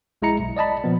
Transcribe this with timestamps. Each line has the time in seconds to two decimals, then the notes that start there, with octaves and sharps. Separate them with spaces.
0.22 A#1 G#3 E4 A#5 C#7
0.40 B1
0.57 D5 D#5 A5 B5
0.84 A#2 F3 B3